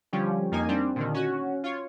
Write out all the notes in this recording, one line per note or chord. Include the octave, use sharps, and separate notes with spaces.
D3 F3 G3 C#4 G4
F2 A#3 D#4 G#5
G3 C4 D4
A#2 D3 D#3
C#4 F#4
F4 C#5